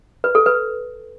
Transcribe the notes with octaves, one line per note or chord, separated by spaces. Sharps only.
B4
A4
B4